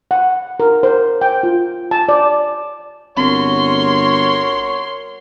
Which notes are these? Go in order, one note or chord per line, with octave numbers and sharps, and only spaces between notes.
F#5
A#4
C5
G5
F4
A5
D5
G1 C4 F#4 A#4 C#5 C6